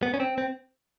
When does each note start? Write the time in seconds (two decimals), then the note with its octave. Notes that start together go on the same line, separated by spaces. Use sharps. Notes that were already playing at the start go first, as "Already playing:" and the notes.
0.03 B3
0.14 C#4
0.20 C4
0.38 C4